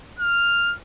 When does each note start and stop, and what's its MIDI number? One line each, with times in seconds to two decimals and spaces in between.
0.19 0.75 89